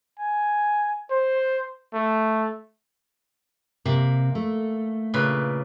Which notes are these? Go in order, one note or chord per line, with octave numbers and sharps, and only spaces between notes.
G#5
C5
A3
C3 A#3
A3
A#2 C#3 B4